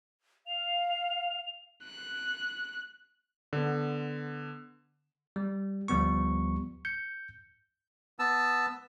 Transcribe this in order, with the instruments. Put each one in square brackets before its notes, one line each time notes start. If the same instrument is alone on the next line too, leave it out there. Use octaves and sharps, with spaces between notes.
[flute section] F5 [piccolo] F7
[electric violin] F#6
[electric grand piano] D3 B3
[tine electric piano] G3
D2 F3 G3 B3 C#6
G6 C#7
[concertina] B3 A5 E6